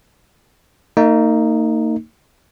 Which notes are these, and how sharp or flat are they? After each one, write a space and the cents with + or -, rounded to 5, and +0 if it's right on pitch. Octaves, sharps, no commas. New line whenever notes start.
A#3 -40 D#4 +0